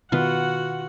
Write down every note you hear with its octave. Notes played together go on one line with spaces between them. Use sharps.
B2 D#3 B3 F4 F#4 B4 F#5